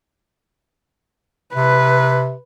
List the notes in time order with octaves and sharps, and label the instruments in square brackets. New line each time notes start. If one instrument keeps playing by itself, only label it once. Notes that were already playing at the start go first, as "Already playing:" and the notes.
[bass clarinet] C3 [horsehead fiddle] B4